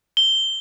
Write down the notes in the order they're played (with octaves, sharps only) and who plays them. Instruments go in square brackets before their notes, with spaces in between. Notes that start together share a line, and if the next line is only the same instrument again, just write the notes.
[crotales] G7